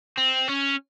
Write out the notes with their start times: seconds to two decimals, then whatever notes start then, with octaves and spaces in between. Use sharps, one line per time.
0.17 C4
0.48 C#4